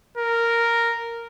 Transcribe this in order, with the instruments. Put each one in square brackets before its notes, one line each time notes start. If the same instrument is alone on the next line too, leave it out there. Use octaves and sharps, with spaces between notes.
[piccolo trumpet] A#4